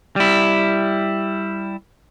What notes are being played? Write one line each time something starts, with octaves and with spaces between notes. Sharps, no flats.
G3 E4